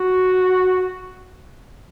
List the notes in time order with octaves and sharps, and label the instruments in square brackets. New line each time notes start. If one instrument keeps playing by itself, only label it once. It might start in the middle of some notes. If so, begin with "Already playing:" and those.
Already playing: [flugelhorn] F#4